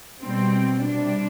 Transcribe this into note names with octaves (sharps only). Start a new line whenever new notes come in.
B2 G3 C4
C3 G3 D4